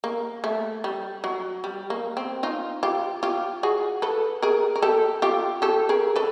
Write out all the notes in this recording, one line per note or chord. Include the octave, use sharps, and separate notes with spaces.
A#3
A3
G3
F#3
G3
A#3
C4
D#4 F4
F4 G4
F4 G4
F#4 G#4
A4 B4
G#4 A#4
A#4
G4 A4
F4 G4
G4 A4
G#4 A#4
A4 B4